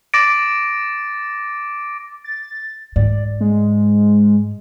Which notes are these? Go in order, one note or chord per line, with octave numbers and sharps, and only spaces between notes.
D6 A6 A#6 D7
A6
G#2 D5
G#3